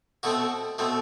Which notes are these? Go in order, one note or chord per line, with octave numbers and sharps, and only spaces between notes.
B2 A3 C4 F#4
B2 A3 C4